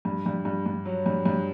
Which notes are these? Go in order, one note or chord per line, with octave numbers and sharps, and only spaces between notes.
G2
G2
G2
G2
F#3
G2
G2